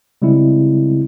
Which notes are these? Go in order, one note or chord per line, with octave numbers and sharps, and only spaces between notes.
C#3 G3 G#3 C4 E4